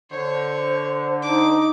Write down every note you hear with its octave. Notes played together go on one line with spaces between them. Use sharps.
D3 C5 C#5
D#4 D6